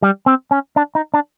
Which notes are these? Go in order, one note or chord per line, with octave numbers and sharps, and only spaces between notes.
G3
C4
C#4
D4
D#4
D4